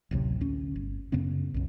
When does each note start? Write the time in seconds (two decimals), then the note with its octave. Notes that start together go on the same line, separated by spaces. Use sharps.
0.11 A1 D2 C3 F#3
0.41 D2 C#4
0.76 G1
1.12 F#2 C#3 B3 C#4
1.54 B1 F#2